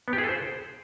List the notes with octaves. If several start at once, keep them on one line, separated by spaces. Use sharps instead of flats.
B3
G4
G#4
A4
C5